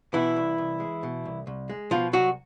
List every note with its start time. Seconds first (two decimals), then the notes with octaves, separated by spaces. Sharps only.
0.14 B2 E3 E4
0.36 C2
0.58 C2
0.80 G#3
1.03 B2
1.25 C2
1.47 C2
1.69 G#3
1.91 B2 F3 F4
2.13 C2 F#3 F#4